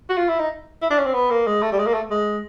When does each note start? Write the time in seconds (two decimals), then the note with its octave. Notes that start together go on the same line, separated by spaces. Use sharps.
0.10 F#4
0.18 F4
0.29 E4
0.39 D#4
0.82 E4
0.90 D4
0.99 C#4
1.06 C4
1.14 B3
1.31 A#3
1.47 G#3
1.62 A3
1.72 G3
1.79 G#3
1.87 A#3
1.94 A3
2.10 G#3